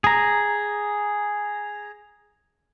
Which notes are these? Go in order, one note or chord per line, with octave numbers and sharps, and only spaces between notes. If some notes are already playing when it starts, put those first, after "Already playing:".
G#4 A#5